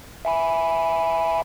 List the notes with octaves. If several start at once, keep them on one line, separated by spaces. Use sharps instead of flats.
E5 G#5 B5